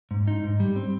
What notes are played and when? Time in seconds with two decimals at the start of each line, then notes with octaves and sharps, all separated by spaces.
0.11 G#2
0.27 D#4
0.44 G#2
0.60 G3
0.76 C4